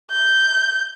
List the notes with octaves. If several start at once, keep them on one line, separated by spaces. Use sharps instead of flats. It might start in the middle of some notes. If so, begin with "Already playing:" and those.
G6